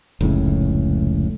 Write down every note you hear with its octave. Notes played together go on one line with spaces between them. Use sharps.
F1 C#2 A2 C#3